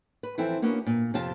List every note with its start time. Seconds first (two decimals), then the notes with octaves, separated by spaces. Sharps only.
0.23 B4
0.38 E3 F3 C4 E4 A4
0.62 A#3 B3 C#4 D4 F#4 A#4
0.87 A#2
1.14 F2 C3 F4 A5